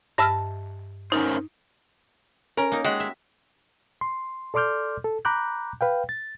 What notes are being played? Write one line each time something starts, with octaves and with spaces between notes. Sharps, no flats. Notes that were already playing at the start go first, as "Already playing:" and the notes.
G2 D#5 E5 A5 E6 F6
C#4 D#4 A#4 C5
C#4 A#4
A#3 D#4
G#3 F#4 G4
E5
C6
A4 D5 C6 D6 F6 G6
A4
A#5 B5 D6 F#6 G6
B4 F5 G5
A6